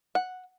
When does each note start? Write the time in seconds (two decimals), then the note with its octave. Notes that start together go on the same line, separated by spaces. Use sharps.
0.15 F#5